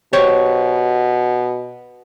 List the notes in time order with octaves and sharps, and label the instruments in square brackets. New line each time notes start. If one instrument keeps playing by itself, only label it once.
[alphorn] B2 [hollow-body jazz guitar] G4 C5 C#5